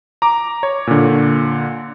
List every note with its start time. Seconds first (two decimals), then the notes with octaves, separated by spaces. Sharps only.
0.22 A#5 D6
0.63 C#5
0.87 A#2 D3